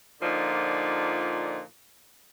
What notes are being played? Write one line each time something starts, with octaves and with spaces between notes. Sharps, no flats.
A#2 D3 F3 D#4 D5